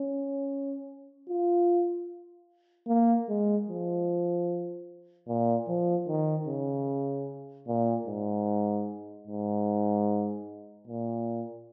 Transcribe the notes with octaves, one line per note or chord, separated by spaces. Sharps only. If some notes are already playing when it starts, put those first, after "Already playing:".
Already playing: C#4
F4
A#3
G#3
F3
A#2
F3
D#3
C#3
A#2
G#2
G#2
A#2